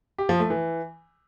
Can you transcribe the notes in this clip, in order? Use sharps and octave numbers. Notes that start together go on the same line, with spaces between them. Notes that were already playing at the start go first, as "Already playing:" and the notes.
G4
F3
A3
E3